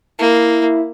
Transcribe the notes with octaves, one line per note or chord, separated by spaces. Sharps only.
A#3 E4